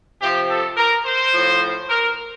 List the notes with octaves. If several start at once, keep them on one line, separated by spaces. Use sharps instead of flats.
C3 F3 G4
A4
A#4
C5
A2 F3
A#4